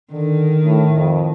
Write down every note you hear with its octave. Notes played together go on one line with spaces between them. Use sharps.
D3 D#3
A2
F2